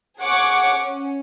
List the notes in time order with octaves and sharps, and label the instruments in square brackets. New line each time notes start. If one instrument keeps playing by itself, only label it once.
[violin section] G#4 C#5 F#5 C#6 D6
C#4